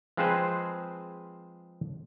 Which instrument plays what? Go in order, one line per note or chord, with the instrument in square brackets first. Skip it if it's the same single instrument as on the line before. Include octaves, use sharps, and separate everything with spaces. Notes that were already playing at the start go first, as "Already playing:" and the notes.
[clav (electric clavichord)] F3 G#3 C4 G#4 B4 C5